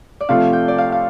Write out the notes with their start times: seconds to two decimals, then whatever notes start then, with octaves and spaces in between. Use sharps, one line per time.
0.21 D5
0.29 C3 F3 A3 F4 F5
0.53 G5
0.68 D5
0.78 F5
0.92 F5